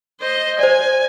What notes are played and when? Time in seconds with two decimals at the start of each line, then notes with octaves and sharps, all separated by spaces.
0.20 C5 D#5
0.59 C5 D5 G#5